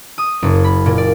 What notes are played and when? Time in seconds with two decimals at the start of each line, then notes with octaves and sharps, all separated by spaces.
0.18 D#6
0.42 F#1
0.64 B5
0.86 A#2
0.98 D5